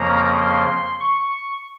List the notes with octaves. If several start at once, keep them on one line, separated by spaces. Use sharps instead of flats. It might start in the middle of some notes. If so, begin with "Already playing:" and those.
Already playing: F2 C#3 F3 A#3 A#5
C6
C#6